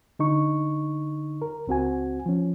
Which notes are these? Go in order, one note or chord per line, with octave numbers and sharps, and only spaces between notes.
D3 D#4 C#6
A#4
C#2 C4 F#4 G#5
F3 C#4